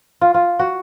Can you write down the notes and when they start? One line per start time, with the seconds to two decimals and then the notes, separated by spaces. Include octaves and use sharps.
0.21 F4
0.34 F4
0.59 F#4